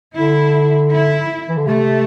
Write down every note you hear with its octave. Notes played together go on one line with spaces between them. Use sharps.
D3 E4
E4
E3
D3
C3 A3